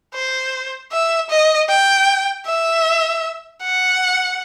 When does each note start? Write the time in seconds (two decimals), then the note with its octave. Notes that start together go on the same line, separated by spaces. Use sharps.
0.15 C5
0.92 E5
1.30 D#5
1.69 G5
2.46 E5
3.62 F#5